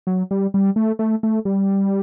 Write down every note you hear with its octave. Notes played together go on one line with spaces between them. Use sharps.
F#3
G3
G3
A3
A3
A3
G3